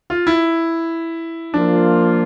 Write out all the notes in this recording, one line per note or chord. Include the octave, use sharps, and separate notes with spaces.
F4
E4
F3 A#3 D4 F4